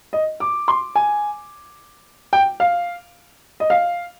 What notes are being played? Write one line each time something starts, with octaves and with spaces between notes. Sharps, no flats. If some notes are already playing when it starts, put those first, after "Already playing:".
D#5
D6
C6
G#5
G5
F5
D#5
F5